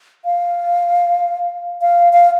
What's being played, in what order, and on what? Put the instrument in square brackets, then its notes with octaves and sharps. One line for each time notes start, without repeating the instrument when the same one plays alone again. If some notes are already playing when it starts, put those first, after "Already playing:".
[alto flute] F5
F5
F5